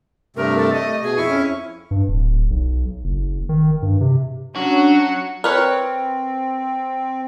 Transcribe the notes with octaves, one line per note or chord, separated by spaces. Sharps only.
G2 C3 A3 A#4
A4
A3 D#5
B2 G#4
F2 E4 C#6
C#4
G2
D1
B1
F#1
D#3
G2
C3
F#3 C#4 D4 F#4
C4 A#4 B4 C#5